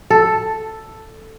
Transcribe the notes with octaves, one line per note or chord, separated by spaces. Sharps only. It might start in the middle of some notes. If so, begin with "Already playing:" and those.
A4